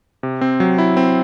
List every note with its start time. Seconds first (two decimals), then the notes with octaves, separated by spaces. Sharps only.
0.23 C3
0.41 C4
0.60 F#3
0.78 E4
0.97 C4